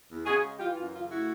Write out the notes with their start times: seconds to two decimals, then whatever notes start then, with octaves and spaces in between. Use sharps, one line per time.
0.09 E2
0.26 C#3 F#4 G#4
0.43 G#3
0.60 E3 F4 G4
0.77 F#2 F4
0.94 C#3 F4
1.11 A3 E4 F#4